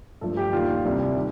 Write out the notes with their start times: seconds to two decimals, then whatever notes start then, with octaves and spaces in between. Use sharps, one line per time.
0.21 G2 F3 A3 A4
0.37 G4
0.52 D#2 D#3 A3 D4 F4
0.85 C2 C3 G3 D4
1.15 D#3